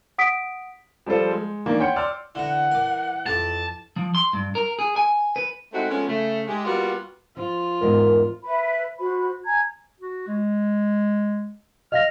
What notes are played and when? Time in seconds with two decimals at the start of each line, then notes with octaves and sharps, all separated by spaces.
0.18 F#5 D#6 B6 D7
1.06 F3 G3 F4 A4 C5
1.31 G#3
1.66 D#3 E3 A#3 D4
1.80 C#5 F#5 G5 C6 G6 C#7
1.96 D5 C6 E6 F6
2.35 D3 E3 F#5 A#5
2.71 A#4 D6
3.26 F2 A5 D6
3.96 F3
4.15 C6
4.33 G2
4.55 A#4
4.79 G#4
4.96 G#5
5.36 B4
5.73 G#3 A3 C4 D#4 E4 F#4
5.91 F3 G#3 A3 B3 C#4
6.08 C#3 A3
6.48 G#3 G4
6.65 G3 A#3 B3 F4 F#4
7.37 F3 F4
7.81 E2 G#2 A#4 D#5
8.44 B4 E5 B5
8.97 F#4 C5 B5
9.44 G#5 A#5 G#6
10.00 F#4
10.27 G#3
11.92 D#5 F5 F6 A#6